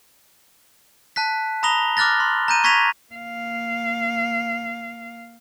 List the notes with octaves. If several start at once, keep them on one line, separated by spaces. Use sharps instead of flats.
A5 F#6 B6
A#5 B5 D#6 A#6 F7 G7
D6 F6 F#6 A6 A#6
C6
A#5 G6 D#7
C#6 G#6 A#6 B6 D#7 F7
A#3 F5